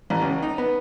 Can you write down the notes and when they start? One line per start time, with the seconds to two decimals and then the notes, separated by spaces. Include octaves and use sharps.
0.10 A1
0.22 C#2
0.42 D#4
0.58 B3